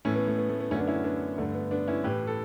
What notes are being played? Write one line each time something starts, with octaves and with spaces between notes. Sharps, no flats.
A2 E3 A3 C#4
B3
A3
B3
A3
B3
F#2 D3 A3 C#4
B3 D4
C#4 E4
B3 D4
G2 D3 A3
B3
B3 D4
C#4 E4
A2 E3 G4 B4
A4